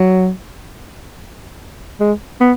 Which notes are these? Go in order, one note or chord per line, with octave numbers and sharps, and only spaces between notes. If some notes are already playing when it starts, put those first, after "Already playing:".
Already playing: F#3
G#3
B3